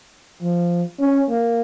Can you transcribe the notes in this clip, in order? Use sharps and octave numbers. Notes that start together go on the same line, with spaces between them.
F3
C#4
A#3